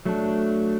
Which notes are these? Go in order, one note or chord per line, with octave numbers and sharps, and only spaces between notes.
F#3 A3 D4